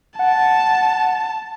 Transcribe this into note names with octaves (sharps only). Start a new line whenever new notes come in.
F#5 A5